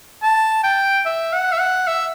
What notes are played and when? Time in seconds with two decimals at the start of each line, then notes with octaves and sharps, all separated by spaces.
0.22 A5
0.63 G5
1.05 E5
1.33 F#5
1.52 E5
1.59 F#5
1.87 E5